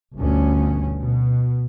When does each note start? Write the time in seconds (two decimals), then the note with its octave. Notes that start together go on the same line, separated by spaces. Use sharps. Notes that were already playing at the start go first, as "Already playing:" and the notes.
0.17 G1 D2 B2 C#4
1.01 B2